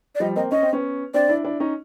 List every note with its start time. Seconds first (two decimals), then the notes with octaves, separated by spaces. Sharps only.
0.15 D5
0.20 F3 G3 D#5
0.36 A#3 C4 D#5
0.51 C#4 D#5
0.63 C4
0.73 B3 C#4
1.14 C4 D4 D5
1.29 D4 E4
1.44 D4 E4
1.60 C#4 D#4